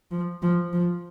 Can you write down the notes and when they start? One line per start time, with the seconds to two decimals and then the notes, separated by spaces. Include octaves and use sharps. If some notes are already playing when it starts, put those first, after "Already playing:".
0.11 F3
0.42 F3
0.73 F3